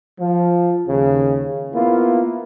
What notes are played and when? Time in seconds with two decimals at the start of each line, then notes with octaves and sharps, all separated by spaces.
0.20 F3
0.88 D#2 C#3
1.74 A#3 B3 E4 F4